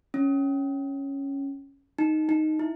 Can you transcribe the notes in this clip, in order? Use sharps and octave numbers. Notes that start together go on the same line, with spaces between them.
C#4
D#4
D#4
E4